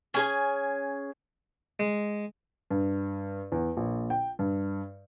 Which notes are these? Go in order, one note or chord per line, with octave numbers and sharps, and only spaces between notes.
C#4 G#4 G#5
G#3
G2
E2
A#1
G5
G2